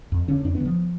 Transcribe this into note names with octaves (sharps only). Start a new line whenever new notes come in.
F2
D3 C#4
F2 D4
B3
D3
F3